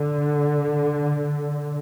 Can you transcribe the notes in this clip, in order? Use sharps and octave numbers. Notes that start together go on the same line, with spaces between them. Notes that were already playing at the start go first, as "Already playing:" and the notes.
Already playing: D3